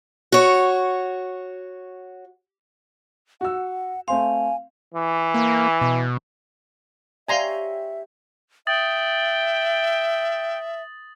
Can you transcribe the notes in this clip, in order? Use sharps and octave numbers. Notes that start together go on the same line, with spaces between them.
F#4 C#5
F#4 F#5 E6
A3 C4 F5 G#5 C6
E3
A#3
B2
G4 C#5 D5 E5 F5 G#5 A#5 C6
E5 G5 D#6 A6 F#7